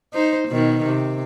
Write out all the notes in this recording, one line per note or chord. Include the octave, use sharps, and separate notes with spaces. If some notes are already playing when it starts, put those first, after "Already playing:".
D#4 C5
B2 D#3
C3